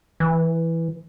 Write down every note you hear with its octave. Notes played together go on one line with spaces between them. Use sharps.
E3